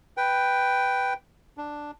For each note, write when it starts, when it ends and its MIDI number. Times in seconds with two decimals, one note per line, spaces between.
0.17 1.14 71
0.17 1.14 79
1.58 1.91 62